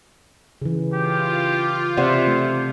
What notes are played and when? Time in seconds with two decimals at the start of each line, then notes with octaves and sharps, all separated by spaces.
0.62 C#3 E3
0.94 F4 G4
1.97 C3 C5 D5 E5 F#5
2.27 A3